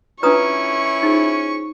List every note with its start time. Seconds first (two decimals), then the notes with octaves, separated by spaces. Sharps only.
0.23 C#4 D4 E4 F4 B4 A#5 C#6 D#6
1.03 D#4 F4 G#4 C5